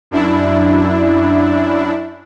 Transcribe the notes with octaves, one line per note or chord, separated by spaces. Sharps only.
F#2 D4 E4